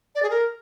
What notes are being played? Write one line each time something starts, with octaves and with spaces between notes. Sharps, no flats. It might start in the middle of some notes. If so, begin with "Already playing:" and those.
D5
G#4
A#4